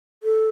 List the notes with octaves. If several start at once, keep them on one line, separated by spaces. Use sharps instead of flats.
A4